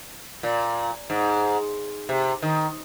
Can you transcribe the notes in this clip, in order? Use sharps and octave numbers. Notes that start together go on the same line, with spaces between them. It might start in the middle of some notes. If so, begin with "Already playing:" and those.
A#2
G#2
C3
D#3